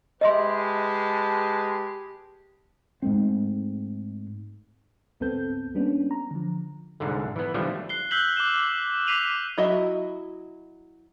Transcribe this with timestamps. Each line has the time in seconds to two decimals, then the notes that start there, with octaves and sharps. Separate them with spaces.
0.21 G#3 G4 B4 D#5 E5 A5 C6
3.02 G#2 G#3 A3 C4
5.20 C#2 G2 B3 C4 A4 G6
5.75 G3 A#3 B3 C#4 D4
6.11 A#5
6.31 D3 F3
7.00 C2 G#2 D3
7.36 E3 B3
7.54 D3 E3 F3 G3 A3
7.89 F#6 C7 G7
8.11 E6 F#6 G6 B6 F#7 G7
8.36 D6 F6 F#6 E7 G7
9.06 D6 B6 C7 D#7 F7 F#7
9.58 F#3 E4 F#4 D#5 E5